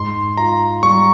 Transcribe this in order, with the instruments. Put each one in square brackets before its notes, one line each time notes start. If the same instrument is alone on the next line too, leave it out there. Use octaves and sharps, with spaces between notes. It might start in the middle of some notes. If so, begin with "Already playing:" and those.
Already playing: [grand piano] G#2 [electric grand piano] C6
[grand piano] F4 [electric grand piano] A#5
[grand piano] G3 [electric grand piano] C#6